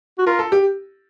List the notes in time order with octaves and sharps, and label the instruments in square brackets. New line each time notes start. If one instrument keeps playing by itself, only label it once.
[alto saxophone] F#4
[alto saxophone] F4 [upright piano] A#4
[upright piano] A4
G4